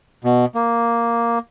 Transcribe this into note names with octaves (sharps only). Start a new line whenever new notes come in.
B2
A#3